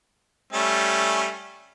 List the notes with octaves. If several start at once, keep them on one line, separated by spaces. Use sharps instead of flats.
G3 A3 C#4